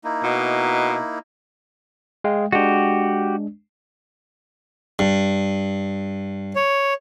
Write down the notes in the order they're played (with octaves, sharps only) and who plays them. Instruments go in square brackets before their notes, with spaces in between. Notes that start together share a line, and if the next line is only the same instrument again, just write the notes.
[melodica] A#3 D#4 E4
[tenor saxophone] B2
[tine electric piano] G#3 F5 G5
[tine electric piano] G#3 D4 [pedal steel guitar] F#4 G4
[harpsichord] G2
[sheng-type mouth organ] C#5